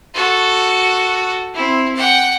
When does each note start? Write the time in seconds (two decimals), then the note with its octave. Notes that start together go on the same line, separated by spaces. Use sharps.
0.14 F#4 A4
1.54 C4 E4
1.95 F#5 G5